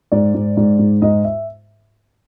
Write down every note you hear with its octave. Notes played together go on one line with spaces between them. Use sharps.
G#2 D5
G#2
G#2
G#2
G#2 D#5
E5